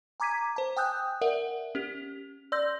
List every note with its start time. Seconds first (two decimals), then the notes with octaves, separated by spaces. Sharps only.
0.20 G#5 A#5 D6 G#6 B6 D#7
0.56 C5 A5
0.77 G5 G#5 D#6 E6 F#6 G6
1.21 A#4 D5 E5 F#5
1.75 C#4 G4
2.52 D5 C6 E6 G6 A#6